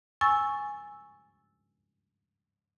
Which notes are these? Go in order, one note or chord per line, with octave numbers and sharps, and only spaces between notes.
G#5 C#6 E6 A6